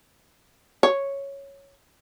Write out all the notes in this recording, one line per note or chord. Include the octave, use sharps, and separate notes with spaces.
C#5